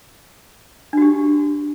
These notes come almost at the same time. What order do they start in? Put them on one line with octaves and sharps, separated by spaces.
D4 F#4 G4